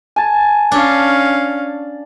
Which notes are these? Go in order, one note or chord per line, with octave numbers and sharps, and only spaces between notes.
G#5 A5
C#4 D4 F5